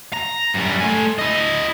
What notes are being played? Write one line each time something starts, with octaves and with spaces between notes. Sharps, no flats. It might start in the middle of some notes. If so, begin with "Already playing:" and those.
A#5
F#2 G3
A3 G#5
E4 D#5